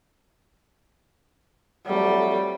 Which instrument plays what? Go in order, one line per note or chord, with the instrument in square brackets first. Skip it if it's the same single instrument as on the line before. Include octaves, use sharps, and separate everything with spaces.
[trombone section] F2 F#3 A3 [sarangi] G3